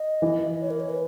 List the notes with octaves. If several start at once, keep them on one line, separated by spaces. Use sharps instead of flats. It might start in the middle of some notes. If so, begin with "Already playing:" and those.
Already playing: D#5
E3
C#5
A#4
C#5
B4